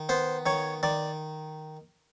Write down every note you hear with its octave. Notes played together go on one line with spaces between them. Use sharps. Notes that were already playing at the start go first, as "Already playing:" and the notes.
Already playing: D#3
B3 C5
D#3 C#5
D#3 D5